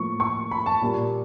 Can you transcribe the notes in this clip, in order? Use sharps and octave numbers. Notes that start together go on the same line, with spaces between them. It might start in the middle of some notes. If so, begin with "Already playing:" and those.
Already playing: A2 F3 A#3 C#6
C#6
B5
A5
A#2 G3 A#3